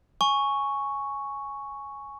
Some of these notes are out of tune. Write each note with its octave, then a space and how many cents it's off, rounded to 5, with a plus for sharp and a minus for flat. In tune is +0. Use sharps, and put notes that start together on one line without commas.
G#5 +0 C#6 +0